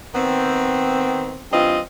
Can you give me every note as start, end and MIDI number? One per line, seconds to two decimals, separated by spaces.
0.15 1.42 51
0.15 1.42 59
0.15 1.42 60
1.52 1.79 43
1.52 1.79 52
1.52 1.79 60
1.52 1.79 65
1.52 1.79 75